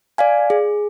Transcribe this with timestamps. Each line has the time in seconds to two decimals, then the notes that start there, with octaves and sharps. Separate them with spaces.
0.18 D5 F5 G#5
0.50 G#4